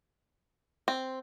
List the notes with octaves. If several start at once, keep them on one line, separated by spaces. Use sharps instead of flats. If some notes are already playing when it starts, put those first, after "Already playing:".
C4